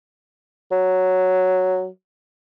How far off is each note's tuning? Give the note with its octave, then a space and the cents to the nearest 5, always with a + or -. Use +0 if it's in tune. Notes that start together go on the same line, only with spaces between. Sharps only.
F#3 +0